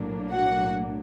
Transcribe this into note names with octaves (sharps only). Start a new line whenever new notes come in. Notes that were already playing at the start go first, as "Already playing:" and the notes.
Already playing: B1 A2 F#3 A#3 D4
F#4 F#5